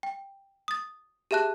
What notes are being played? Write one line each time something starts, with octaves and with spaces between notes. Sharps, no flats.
G5
D#6 A6
G4 G#4 E5 A5 F#6